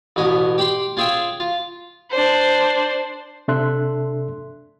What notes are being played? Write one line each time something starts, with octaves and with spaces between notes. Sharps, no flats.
A1 B2 C#4 D#5
G4 G5 B5 C6
C#4 F4 G#4 E5 G5
F4
D4 C5
C3 D4 A4 E5 C6 F#6